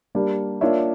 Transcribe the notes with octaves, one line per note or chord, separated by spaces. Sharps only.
G3 A#3 D4 G4
A#3 D4 F4 C#5 E5